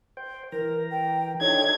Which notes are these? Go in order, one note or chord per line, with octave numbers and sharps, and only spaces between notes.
C5 G5
E3 A#4 A#5
G5
D4 D#4 A4 C#5 G#6